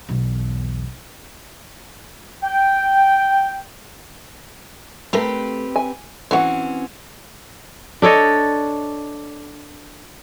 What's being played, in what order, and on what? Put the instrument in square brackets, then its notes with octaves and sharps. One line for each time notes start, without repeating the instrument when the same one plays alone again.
[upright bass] B1 E2
[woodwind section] G5
[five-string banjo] A3 A#4 [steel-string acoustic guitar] C4 G4 B4
[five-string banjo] G#5
[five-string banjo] E3 F#4 F#5 [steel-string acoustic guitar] C4 C#4
[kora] D4 A4 C#5 D#5